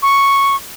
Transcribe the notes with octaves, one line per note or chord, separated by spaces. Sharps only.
C#6